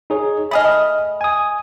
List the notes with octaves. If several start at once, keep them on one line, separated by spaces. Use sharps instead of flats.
D#4 G#4 C#5
A3 G#4 D#5 B5 D#6 F6
G#5 D#6